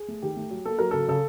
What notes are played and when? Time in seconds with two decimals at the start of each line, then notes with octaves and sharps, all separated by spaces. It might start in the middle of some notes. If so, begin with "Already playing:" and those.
Already playing: G#4
0.08 A3
0.22 D#3 G4
0.37 A3
0.51 F#3
0.66 A#3 A4
0.79 F#3 A#4
0.91 C#3 A4
1.08 C#3 A4